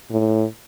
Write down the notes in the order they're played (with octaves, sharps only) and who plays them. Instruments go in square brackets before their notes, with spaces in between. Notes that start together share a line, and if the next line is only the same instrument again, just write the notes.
[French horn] A2